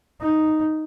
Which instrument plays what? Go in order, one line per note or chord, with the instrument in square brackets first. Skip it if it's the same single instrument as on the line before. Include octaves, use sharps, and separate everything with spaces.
[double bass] D#4